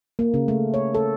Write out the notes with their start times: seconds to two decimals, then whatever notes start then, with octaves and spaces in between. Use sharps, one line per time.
0.19 A#3
0.34 C#3
0.48 A3
0.74 C#5
0.95 A4